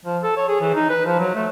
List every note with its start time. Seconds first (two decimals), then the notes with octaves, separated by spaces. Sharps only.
0.05 F3
0.23 A4
0.37 C#5
0.48 G#4
0.61 E3
0.75 D#4
0.89 B4
1.05 F3
1.19 F#3
1.35 A3